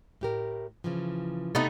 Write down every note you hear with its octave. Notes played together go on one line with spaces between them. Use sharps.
A2 G4 A#4
C#3 E3 F3
C3 A3 B3 D#4